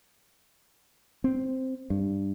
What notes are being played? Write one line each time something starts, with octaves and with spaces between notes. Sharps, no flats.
C4
G2